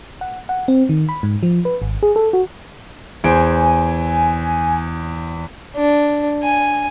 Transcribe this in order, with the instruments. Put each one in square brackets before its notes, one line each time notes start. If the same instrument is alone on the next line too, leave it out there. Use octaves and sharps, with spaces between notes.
[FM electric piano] F#5
F#5
C4
D#3
B5
G#2
F3
B4
G#1
G#4
A4
F#4
[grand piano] E2 C5 D7 [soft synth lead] G#5
[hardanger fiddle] D4
G#5